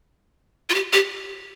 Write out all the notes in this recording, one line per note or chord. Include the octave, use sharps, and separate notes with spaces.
F4
G4
G4